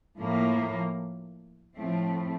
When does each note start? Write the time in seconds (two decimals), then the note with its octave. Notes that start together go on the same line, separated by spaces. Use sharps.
0.20 A2 F3 A#3
1.75 A2 F3 A3 C4